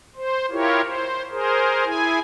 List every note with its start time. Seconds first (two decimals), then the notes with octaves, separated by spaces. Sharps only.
0.16 C5
0.51 E4 F4 G4 A#4 C#5
0.84 C5
1.31 G#4 A#4 C5
1.85 E4 G#4 G#5